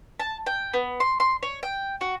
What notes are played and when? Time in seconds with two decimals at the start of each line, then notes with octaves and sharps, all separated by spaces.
0.19 A5
0.46 G5
0.74 B3
1.00 C6
1.20 C6
1.43 C#5
1.63 G5
2.01 F#4